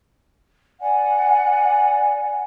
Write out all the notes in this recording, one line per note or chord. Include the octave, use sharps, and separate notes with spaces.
D5 F#5 G#5